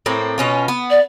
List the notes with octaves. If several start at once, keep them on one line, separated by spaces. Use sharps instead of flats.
A2 A#3 C4
B2 C#4 F4
B3
D5